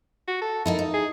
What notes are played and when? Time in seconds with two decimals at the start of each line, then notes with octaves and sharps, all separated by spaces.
0.28 F#4
0.41 A4
0.66 A#3 D#4 E4 A4
0.79 D#4
0.94 G#4